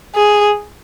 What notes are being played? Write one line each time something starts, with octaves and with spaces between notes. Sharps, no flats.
G#4